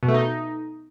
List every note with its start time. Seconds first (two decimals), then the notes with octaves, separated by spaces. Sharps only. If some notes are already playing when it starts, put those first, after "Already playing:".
0.03 B2
0.08 A3
0.14 D#4